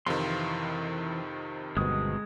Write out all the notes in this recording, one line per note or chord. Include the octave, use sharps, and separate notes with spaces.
F2 C3 D#3 E3 F5 C6
G1 B2 G#3 D#6